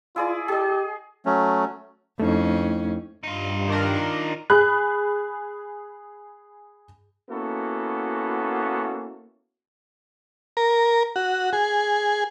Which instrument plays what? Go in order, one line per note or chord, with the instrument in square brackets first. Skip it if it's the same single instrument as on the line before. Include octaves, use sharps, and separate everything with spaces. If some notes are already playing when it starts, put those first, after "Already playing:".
[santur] E4 G#4 D5 [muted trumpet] F4
[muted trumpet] G4 [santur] G#4 D#5
[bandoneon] F#3 A3 C#4
[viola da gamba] F2 C#4 [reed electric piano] A3 D#4 E4
[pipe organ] G2 [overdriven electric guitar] D#4 F4
[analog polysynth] D#3 D4 A#4
[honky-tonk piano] G#4 B5 F#6
[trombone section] A#3 B3 C#4 E4 F#4 A4
[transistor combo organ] A#4
F#4
G#4